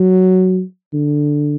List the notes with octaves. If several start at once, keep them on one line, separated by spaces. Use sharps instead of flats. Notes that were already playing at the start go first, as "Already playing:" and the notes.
Already playing: F#3
D3